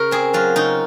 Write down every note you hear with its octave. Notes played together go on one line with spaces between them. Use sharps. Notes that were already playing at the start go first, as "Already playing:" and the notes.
Already playing: C#3 A#4
C4 G#4
F#3 F4
C#3 D#4